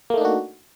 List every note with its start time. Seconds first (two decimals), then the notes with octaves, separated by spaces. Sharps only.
0.10 A#3
0.14 A3
0.17 D#4
0.21 D4
0.25 F#4